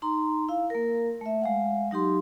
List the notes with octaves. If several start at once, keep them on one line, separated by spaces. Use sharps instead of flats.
D#4 A#5 C6
E4 F5
A#3 A#4
A3 E5
G#3 F5 F#5
F#3 D#4 G4 C6